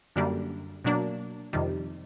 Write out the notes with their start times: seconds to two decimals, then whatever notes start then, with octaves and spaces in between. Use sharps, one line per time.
0.16 F#2 D3 G3 A#3
0.85 B2 F#3 A#3 D4
1.53 F2 C3 D#3 G3